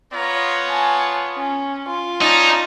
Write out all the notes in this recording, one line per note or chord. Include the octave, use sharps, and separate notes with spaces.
B3 F4 C#5 A#5
G#5 A5
C#4
F4
C#4 D#4 D5 A5